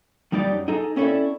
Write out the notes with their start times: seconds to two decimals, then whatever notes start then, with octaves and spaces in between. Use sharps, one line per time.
0.32 F2 G3 D#4 G4 D5
0.52 F#2
0.68 D#4 G#4 A4 D#5 A#5
0.96 C4 C#4 E4 A4 D5 E5